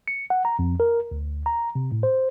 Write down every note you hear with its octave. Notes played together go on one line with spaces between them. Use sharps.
C#7
F#5
A#5
F2
A#4
D2
A#5
C3
A2
C5